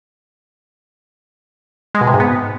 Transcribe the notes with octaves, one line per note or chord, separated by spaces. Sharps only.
G#3
B2
C3
G#2
B3